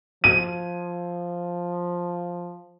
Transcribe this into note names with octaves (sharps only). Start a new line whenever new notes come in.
F3 D#7